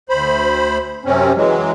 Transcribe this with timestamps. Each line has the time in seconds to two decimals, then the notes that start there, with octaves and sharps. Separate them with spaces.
0.09 D2 C5 B5
1.05 F#2 C3 C4 C#4
1.36 E3 F#3 G#3